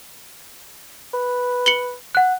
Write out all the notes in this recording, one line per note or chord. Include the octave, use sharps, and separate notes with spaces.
B4
C#7 F#7 G7
F#5 F#6